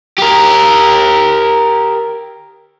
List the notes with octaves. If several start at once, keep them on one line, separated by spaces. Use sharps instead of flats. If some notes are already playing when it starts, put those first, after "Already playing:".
G4 A#4